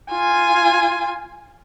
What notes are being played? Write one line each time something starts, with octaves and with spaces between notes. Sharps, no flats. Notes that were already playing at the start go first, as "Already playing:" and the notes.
F4 G#5